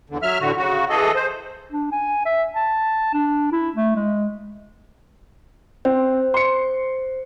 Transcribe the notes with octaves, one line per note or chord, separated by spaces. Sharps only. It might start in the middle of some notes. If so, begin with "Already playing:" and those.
E2 D3
F#3 E5 F6
A2 D3 F#4
C#3 F#4
E3 G#4 A4 D#5
C5
D4
G#5
E5
A5
D4
E4
A3
G#3
C4 C5
C6 C#7